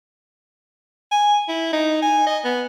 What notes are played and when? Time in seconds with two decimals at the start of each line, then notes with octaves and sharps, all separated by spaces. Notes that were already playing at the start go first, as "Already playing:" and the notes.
1.12 G#5
1.49 E4
1.73 D#4
2.03 G#5
2.27 D#5
2.45 B3